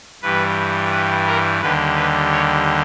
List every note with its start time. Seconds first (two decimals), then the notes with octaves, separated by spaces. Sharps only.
0.22 G2 E3 G3 B4
0.92 B4
1.27 A#4
1.61 D#2 D3 G3 B4
1.96 B4
2.32 C#5